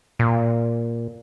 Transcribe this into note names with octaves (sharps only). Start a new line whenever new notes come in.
A#2